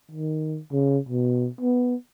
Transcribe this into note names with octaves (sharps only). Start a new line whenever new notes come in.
D#3
C#3
B2
B3